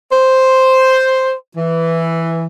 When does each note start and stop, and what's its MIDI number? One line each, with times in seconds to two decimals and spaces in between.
0.12 1.33 72
1.57 2.45 52